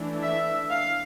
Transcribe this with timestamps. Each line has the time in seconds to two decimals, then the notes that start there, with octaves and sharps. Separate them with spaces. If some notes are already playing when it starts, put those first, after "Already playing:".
Already playing: E3 A3 D4
0.22 E5
0.70 F5